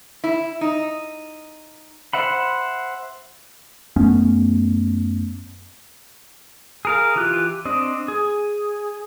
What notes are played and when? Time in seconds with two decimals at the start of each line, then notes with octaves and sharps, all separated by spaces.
0.24 E4
0.61 D#4
2.13 C5 E5 F#5 B5
3.96 F#2 A3 B3 C#4
6.85 G#4 A#4 F5
7.16 E3 F4 G4 F#6
7.65 C4 D4 D#5
8.08 G#4